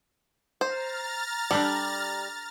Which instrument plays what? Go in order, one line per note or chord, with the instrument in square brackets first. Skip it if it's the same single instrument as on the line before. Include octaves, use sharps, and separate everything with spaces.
[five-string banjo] C5 [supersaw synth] A#5 F6 A6
[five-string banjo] G3 [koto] D4 G4 A4